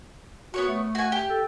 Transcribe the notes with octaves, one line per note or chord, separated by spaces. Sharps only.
B3 F#4 C#5 C#6
A3
F#4 G#5
G4
A4